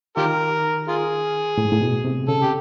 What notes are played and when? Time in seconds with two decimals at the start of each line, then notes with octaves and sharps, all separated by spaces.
0.17 D#3 F4 G4 A#4
0.88 F4 G#4
1.58 A2
1.65 G#2
1.72 A2
1.81 B2
2.05 C3
2.28 C#3 A4
2.42 G4